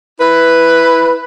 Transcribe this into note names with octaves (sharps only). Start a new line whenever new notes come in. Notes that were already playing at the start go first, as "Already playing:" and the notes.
E4 B4